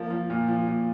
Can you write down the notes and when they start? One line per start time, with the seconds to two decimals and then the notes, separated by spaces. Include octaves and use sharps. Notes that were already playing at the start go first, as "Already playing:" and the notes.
Already playing: F3 A#3
0.10 F3
0.30 A#2
0.48 F3
0.68 A#2